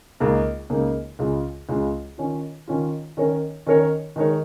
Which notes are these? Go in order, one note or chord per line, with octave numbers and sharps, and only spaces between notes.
C#2 C#3 A#3 D#4
C#2 C#3 A#3 D#4
C#2 C#3 G#3 F4
C#2 C#3 G#3 F4
D#3 C#4 F4
D#3 C#4 F4
D#3 C#4 A#4 C#5
D#3 C#4 A#4 C#5
D#3 G#3 D#4 A#4 C#5